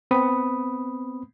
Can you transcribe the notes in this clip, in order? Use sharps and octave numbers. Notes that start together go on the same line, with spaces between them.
B3 C4 B5 D#6